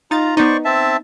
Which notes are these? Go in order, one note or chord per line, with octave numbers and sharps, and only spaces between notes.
D#4 F4 A#5 A6
B3 D#4 C5 D5 C#6
C4 E5 A5